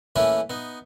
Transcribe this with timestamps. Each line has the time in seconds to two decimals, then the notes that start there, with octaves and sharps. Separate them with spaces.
0.16 E3 A3 A#3 C#4 E4 B4
0.50 B3 D#4